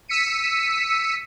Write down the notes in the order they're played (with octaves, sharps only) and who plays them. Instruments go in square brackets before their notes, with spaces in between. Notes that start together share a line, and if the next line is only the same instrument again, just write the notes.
[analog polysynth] E6 B6 C#7 D#7